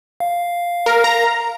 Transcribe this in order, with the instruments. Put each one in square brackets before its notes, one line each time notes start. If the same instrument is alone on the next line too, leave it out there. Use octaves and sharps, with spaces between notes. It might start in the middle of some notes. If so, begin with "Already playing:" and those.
[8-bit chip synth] F5
[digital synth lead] A#4
A#5